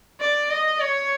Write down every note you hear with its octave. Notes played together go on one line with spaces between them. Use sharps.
D5
D#5
C#5